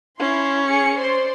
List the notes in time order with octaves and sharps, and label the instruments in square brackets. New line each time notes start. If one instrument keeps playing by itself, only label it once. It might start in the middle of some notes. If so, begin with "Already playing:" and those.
[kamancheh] C#4 [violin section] E4 C6
[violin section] G#4 C#7
C5 D5 C6